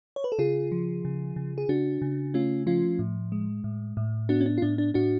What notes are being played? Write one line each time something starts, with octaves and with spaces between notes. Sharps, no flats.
C#5
B4
A4
C#3 F4 G#4
F3
C#3
C#3
G#4
C#3 D4 F#4
C#3
A3 C#4 F4
F3 C#4 F4
A2
G#3
A2
A2
B3 D4 F#4
C#4
D4
F4
A2 D4
D4
A2 D4 F#4